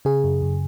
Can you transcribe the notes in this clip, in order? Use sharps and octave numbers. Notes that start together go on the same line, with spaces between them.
C#3 G#4
F#2
F#2